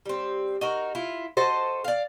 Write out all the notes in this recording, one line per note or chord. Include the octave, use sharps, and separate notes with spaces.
G3 C4
D#4 F#4 A#4
E4 F4
F#4 A4 C5 D#5
D5 F5